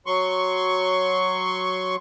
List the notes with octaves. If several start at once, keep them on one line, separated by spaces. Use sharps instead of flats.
F#3 C6 C#6